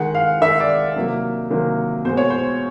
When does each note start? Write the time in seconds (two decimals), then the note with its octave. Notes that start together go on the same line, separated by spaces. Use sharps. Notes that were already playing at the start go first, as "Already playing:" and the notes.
Already playing: D#3 G#3 F#5
0.15 F5
0.41 D#3 G#3 E5
0.60 D5
0.96 C3 D#3 F#3 A#3
1.50 C3 D#3 F#3 A#3
2.05 B2 G#3 C5
2.17 C#5
2.30 C5